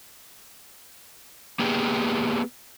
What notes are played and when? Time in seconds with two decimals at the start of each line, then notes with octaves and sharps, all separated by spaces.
1.59 A#3 B3 G4 G#4